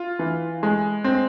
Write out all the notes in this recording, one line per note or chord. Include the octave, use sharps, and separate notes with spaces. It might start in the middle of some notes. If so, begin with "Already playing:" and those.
Already playing: F4
E3
G#3
C4